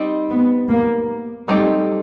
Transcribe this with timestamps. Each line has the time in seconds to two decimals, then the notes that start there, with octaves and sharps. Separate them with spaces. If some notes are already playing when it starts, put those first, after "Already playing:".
Already playing: G3 C4 D#4
0.30 B3
0.69 A#3
1.48 F#3 G3 A3 C4 D#4 G4